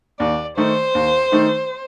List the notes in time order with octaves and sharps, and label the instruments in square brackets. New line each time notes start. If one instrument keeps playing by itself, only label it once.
[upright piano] D#2 [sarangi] D5
[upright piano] D#3 A3 D#4 [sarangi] C5
[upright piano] D#2
D#3 A3 D#4